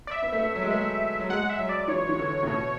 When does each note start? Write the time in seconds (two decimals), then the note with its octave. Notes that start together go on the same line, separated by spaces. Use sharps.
0.07 D5
0.11 E5
0.22 B3
0.32 A3
0.42 B3
0.55 F#3
0.63 G#3
0.70 A3
1.20 F#3
1.29 G#3 F#5
1.50 E5
1.59 F#3
1.69 D5
1.88 E3 C#5
2.09 E3
2.19 D3
2.43 A2
2.47 B2